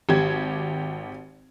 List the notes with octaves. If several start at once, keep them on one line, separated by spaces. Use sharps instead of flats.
G#1 G4 G#6